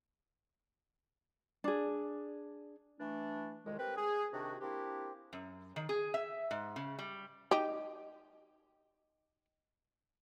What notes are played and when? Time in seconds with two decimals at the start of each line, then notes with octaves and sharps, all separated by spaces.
1.64 D4 G#4
2.99 E3 A3 D4
3.65 C2 F2 D#3 G#3
3.78 C4 G4 A#4 B4
3.96 G#4
4.33 C3 D#3 D4 F#4
4.60 A#3 C4 D4 E4 G4
5.33 F#2
5.76 D#3
5.89 G#4
6.14 E5
6.51 G#2
6.76 C#3
6.99 G3
7.51 D#4 G4